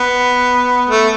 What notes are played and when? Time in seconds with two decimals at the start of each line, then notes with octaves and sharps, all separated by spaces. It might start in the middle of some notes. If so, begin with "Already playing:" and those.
Already playing: B3
0.90 A3